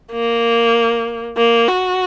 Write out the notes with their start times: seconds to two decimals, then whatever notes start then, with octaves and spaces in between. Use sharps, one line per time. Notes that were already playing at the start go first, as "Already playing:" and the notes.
0.12 A#3
1.37 A#3
1.68 F#4